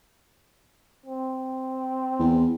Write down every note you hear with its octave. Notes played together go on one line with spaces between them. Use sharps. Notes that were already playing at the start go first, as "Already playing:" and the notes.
C4
E2